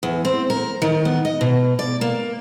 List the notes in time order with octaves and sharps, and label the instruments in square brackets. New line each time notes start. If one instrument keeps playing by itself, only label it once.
[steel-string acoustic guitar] E2
C4
A#4
D#3
B3
D#5
B2
D5
A#3